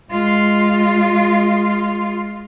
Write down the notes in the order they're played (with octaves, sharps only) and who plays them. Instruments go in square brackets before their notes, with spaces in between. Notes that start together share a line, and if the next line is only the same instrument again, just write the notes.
[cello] G#3 F4